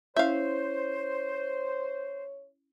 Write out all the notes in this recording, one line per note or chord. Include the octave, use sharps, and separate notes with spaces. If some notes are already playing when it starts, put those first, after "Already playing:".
C#4 E4 C5 C#5 E5 F5 G6